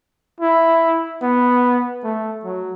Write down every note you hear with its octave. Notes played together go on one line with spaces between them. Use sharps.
E4
B3
A3
F#3